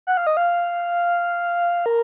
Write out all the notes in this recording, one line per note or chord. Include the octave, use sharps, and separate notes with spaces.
F#5
F5
D#5
F5
A#4